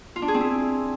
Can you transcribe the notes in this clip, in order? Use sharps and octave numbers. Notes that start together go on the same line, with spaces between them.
F4
D4
G#4
C4
E4